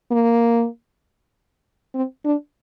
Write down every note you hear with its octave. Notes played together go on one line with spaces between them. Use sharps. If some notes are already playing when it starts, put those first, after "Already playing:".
A#3
C4
D4